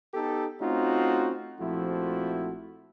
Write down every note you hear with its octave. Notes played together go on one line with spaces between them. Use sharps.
B3 D#4 G4 A4
A3 C4 C#4 D#4 F4 F#4
A#1 F3 A3 C4 E4 F#4